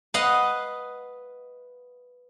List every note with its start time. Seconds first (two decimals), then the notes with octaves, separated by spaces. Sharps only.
0.14 B4 D#5 F5 F#5